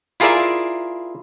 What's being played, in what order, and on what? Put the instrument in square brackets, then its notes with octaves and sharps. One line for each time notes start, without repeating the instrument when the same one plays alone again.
[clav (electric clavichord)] E4 F4 G#4 A#4 D5 E5